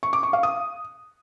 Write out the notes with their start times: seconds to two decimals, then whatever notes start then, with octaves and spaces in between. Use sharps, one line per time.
0.03 C#6
0.13 D6
0.23 C#6
0.33 F5
0.43 D#6